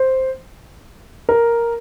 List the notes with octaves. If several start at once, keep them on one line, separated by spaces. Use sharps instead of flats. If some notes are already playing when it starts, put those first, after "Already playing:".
Already playing: C5
A#4